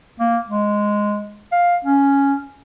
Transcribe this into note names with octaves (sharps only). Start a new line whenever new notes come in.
A#3
G#3
F5
C#4